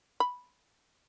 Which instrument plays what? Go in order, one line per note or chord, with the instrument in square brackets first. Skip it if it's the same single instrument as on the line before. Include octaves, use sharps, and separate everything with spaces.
[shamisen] B5